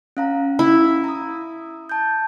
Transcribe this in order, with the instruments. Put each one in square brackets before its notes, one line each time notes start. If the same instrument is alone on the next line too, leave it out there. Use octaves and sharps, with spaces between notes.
[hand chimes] C#4 F5 A#5
[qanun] E4
[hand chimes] A#5 D#6
A5 G6